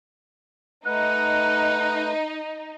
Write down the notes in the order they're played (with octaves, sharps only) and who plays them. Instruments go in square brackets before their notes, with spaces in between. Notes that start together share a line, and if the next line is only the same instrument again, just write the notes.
[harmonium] A3 B4 [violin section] D#4 [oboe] F#5